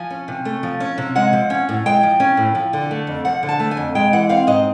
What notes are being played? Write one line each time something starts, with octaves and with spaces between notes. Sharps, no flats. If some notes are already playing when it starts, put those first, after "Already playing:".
Already playing: F3 G#5
C#4
C3
A3
F3
C#4
C3
G#3 F#5
F3
C#4
A2
G#3 G5
F3
C#4
A2
F3
D3
A3
F2
F3 F#5
D3
A5
A3
G#5
F2
G#3 G5
E3 F#5
C4 F5
G#2 D#5